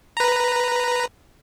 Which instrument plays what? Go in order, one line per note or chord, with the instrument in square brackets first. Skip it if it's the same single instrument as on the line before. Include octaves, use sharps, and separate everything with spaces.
[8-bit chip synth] B4 A#5